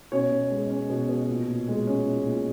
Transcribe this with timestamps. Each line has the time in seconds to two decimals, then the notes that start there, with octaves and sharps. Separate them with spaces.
0.12 B2 C#4 C#5
0.31 B2
0.50 G#3
0.70 C#4
0.89 B2
1.09 B2
1.29 A#2
1.48 A#2
1.68 G#3
1.87 C#4
2.06 A#2
2.25 A#2